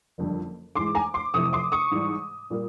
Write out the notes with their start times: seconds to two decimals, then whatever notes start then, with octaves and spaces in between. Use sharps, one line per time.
0.18 F#1 F2 D3 G3
0.75 G#2 E3 G#3 C6 D6
0.95 G#5 A#5
1.14 C6 D6
1.34 F1 F2 C3 E3 A3 C#6 D#6
1.53 C6 D6
1.72 C#6 D#6
1.91 G#2 E3 G3
2.50 A#2 G3 A#3